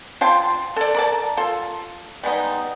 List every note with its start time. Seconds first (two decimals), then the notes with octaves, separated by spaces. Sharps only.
0.21 F4 G5 A5 C6
0.76 A4 D5
0.94 A#4 D5 A5
1.37 F4 A4
2.23 G3 G#3 B3 D#4